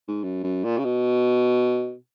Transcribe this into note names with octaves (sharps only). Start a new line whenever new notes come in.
G#2
F#2
F#2
A#2
C#3
B2